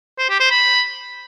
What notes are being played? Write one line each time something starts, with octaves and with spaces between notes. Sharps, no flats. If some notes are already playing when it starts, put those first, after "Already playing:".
C5
G4
C5
B5